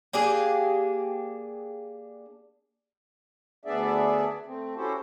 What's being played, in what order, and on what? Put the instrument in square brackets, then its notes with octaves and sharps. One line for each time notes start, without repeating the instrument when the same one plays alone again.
[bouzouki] A#3 D4 G4 G#4
[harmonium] D2 B3 D4 G#4 D5 E5
A3 C4
C#4 E4 F#4 G4 A4 C5